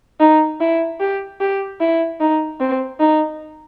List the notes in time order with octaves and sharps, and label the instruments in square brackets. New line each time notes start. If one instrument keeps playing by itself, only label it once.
[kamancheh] D#4
E4
G4
G4
E4
D#4
C4
D#4